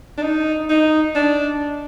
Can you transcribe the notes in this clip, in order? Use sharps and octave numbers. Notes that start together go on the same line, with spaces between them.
D4
D#4
D#4
D4